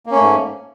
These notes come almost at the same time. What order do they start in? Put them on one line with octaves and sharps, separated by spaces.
A#3 C#4 A3 G#2